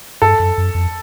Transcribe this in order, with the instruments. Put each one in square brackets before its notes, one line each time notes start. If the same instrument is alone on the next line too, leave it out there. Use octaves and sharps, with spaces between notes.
[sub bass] G2 [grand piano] A4
[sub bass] F#2
F#2
F2